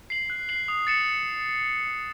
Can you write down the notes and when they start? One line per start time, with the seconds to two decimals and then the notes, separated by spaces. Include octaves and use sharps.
0.10 C7 F#7
0.30 F#6
0.49 C7 F#7
0.68 D#6
0.87 A6 C#7 E7